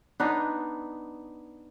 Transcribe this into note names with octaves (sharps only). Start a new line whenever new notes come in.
B3 D4 D#4